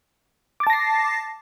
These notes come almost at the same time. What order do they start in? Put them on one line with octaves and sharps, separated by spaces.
D6 A6 A5 A#6 C7